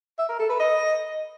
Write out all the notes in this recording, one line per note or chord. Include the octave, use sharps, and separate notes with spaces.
E5
A#4
A4
B4
D#5